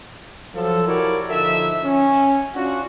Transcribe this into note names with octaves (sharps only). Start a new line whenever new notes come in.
F3 F#3 A4
E4 F#4 G4 A#4 C#5 D5
D3 F3 D#4 A4 E5
C#4
C#4 D4 F4 F#4